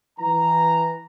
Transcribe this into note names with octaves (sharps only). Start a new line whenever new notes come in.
E3 A#5